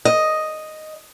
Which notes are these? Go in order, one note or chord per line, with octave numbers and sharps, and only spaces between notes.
D#5